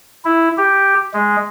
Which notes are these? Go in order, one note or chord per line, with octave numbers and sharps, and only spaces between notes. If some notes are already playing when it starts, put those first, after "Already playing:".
E4
G4
G#3